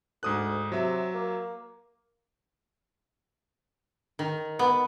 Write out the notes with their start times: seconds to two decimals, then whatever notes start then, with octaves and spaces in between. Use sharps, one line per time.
0.23 D2 G#2 D#6 F#6
0.72 C3 F#3 E5
1.14 A#3
4.19 D#3
4.59 B3